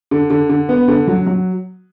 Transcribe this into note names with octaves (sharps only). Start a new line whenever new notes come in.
D3
D3
D3
B3
D3
F#3
F#3